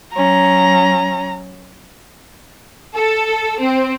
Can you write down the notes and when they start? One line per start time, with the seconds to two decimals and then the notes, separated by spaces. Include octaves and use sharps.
0.14 F#3 C#4 A#5
2.95 A4
3.60 C4